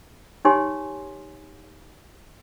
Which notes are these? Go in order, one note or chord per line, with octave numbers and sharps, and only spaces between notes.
D#4 G4 C#5 G#5 C6